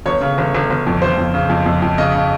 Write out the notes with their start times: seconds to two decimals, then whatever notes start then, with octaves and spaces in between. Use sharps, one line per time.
0.06 G1 C#5
0.21 C#3
0.38 G1
0.54 G1
0.70 G1
0.87 F2
1.02 G1 C5
1.18 F2
1.34 C#3
1.50 F2
1.66 F2
1.82 F2
1.98 C#3 D#5
2.14 C#3